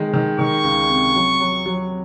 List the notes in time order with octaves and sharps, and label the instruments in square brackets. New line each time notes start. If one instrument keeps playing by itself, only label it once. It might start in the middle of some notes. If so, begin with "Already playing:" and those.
Already playing: [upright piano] D#3 G#3
D#3
[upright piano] D#3 [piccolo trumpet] C#6
[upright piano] C#2
C3
F#3
F#3
F#3